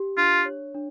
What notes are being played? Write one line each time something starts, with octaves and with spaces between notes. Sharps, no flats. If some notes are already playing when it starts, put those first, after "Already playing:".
Already playing: G4
D4 F4
C#5
D4